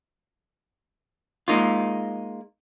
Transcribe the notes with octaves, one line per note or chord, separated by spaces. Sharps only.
G#3 A#3 D#4 F4